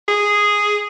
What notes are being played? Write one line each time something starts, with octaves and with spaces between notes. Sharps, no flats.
G#4